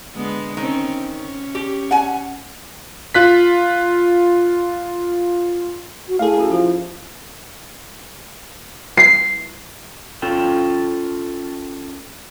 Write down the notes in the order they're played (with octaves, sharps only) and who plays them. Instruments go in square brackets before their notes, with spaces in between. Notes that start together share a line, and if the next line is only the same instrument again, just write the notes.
[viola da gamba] D3 G#3 B3
[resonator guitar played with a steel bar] D#3 [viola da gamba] C4 C#4
[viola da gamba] C#4
[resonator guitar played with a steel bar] G4
F#5 G#5
[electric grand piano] F4 F#6 B6
[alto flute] F#4
[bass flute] A3 [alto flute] E4 [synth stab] G#4 F5
[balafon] C#4 F#4 G4 [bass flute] A4
[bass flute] F3 [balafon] F4
[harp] C7
[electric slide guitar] C#4 F4 A4 G5